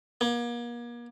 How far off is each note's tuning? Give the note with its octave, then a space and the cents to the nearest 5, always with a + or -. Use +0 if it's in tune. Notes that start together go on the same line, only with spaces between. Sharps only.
A#3 +40